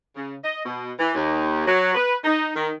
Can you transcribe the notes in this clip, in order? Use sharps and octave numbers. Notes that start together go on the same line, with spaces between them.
C#3
D#5
B2
E3
D#2
F#3
B4
D#4
D#3